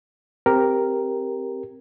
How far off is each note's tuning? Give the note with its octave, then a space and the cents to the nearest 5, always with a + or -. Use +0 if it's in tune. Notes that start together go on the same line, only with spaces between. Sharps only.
C4 +0 G4 +0 A#4 +0